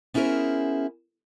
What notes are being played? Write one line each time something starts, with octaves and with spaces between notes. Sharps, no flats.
B3 C#4 E4 G#4 A#4 C5